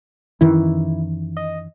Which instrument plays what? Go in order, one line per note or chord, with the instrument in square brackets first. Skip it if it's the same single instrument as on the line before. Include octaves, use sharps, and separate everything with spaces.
[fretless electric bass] F#2 D#3 E3 [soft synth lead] E4
[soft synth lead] D#5